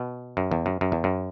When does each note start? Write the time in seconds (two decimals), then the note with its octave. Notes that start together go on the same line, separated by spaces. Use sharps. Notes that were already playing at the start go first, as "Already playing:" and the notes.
Already playing: B2
0.37 F#2
0.51 E2
0.66 F#2
0.81 F#2
0.92 E2
1.04 F#2